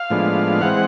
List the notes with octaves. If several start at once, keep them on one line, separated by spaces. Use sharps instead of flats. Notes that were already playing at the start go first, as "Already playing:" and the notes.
Already playing: F5
A2 F3 G#3 B3 D4
E3 G#3 C4 F#5